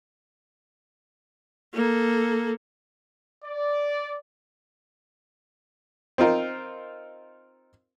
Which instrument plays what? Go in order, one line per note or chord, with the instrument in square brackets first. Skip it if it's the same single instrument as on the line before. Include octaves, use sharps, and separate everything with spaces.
[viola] A#3 A4
[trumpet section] D5
[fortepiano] C4 D#4 F4 A#4